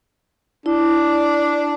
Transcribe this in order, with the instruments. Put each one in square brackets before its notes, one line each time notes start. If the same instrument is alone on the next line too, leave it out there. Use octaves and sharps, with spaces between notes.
[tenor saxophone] D4 [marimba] E4